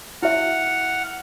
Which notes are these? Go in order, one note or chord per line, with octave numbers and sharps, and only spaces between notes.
E4 F#4 E5 F#5 F6